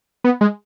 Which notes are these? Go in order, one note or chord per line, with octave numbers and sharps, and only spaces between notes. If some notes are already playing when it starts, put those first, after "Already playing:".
B3
G#3